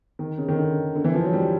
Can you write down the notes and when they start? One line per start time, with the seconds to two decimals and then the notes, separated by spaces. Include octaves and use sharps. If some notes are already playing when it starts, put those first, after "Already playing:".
0.19 D#3
0.38 C#3
0.48 D#3
0.57 D3
0.95 D3
1.04 E3
1.14 F3
1.24 F#3
1.33 G3